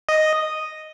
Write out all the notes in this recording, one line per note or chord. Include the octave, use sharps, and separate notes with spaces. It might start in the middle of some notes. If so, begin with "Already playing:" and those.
D#5